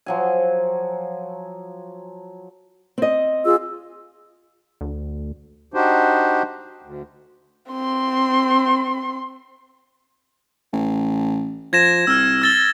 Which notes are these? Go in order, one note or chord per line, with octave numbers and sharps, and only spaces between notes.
F3 F#3 G#5
C4 D#5
F4 G#4 E6
D2
D4 D#4 F#4 G4 C5
D2
C4 C6
A1
F3 G#6 A#6 E7
C2 E6 F6
E6 A6 G7